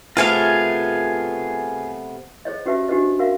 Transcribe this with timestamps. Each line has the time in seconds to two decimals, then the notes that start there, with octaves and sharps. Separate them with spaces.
0.17 C3 A3 B3 F4 G#4 F5
2.45 G#4 C5 C#5 D#5
2.65 C#4 F#4 G4 B4 E5 A5
2.88 D4 F#4 G4 B4 C5 D#5
3.19 F#4 A#4 E5 F5